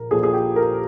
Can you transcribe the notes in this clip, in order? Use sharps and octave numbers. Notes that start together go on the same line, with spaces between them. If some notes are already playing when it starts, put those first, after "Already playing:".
Already playing: A#1 A#2 F3 A#4
A#1 A#2 F3 G#4
G#4
G4
A#4